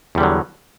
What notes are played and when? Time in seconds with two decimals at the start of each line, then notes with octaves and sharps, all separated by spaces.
0.15 E2
0.18 G3
0.20 D3
0.23 F#3